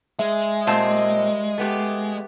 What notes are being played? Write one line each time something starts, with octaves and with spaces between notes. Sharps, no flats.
G#3 E5
A#2 G3 C4 A#4 D#5 A5
A3 B3 G4